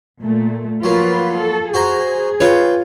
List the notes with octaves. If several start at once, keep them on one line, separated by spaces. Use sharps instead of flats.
A#2 A3
F3 F#3 A#3 F4 B4
A4
F#4 G#4 C5 A#5
F4 B4 C#5 G5